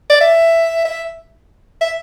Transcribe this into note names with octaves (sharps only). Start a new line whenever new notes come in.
D5
E5
E5
E5